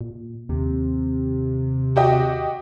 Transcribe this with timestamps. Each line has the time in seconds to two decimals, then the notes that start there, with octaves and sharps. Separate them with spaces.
0.01 A#2
0.49 D#2 C3
1.96 F#4 G4 D#5